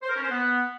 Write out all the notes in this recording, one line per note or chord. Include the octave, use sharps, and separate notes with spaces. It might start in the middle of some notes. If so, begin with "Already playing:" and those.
C5
A#4
C#4
C5
B3